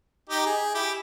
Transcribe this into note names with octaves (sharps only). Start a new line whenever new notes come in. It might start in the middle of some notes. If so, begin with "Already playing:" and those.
D#4 G4
G#4
E4 G4